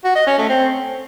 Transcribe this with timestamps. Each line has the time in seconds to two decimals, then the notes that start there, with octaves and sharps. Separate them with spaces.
0.04 F#4
0.16 D#5
0.27 C#4
0.38 A3
0.49 C4